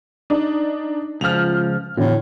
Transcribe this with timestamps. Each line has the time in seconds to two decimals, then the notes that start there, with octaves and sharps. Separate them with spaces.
0.30 D4 D#4
1.21 C#2 F3 F6 F7
1.97 E2 A2 D3